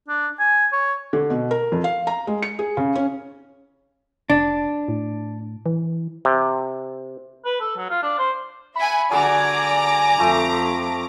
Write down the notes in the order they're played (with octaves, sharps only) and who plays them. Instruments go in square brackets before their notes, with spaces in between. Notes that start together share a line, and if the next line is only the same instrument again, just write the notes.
[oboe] D4
G#5
C#5
[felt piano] D3
B2
A#4
F2
F5
A#5
G#3
C#7
G#4
C#3
C#4
[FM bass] F1 [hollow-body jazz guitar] D4
[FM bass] A2
E3
[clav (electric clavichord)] C3
[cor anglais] B4
A4
F#3
F4
D4
C5
[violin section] E5 F#5 G#5 [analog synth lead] B5
[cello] D3 D5 [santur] F#4 G#4 A#4 [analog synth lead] G#5 [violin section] A#5 D6
[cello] F2 [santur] F3 A3